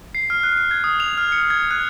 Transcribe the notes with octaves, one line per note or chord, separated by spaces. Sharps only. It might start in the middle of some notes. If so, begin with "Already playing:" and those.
C7
F6
F#6
F#6
G#6
D#6
F7
F6
C#7
G#6
F#6